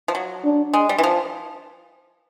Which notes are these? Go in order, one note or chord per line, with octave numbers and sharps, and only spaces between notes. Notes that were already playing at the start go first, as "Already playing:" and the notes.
F3
F#3
D4
G#3
G3
E3
F3